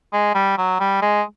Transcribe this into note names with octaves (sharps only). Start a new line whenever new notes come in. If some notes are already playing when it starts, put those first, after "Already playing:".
G#3
G3
F#3
G3
G#3